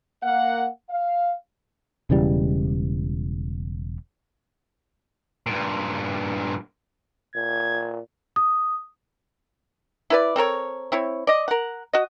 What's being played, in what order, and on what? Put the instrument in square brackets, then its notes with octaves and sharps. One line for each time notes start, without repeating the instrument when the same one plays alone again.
[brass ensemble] A#3 F5 F#5
F5
[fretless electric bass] E1 C#3 E3 G3
[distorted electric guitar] G2 A#2
[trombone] A#2 [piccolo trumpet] G#6
[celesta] D#6
[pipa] E4 B4 D5
C4 A4 A#4 C#5
C4 E4 C#5
D5 D#5
A#4 F#5
F#4 D#5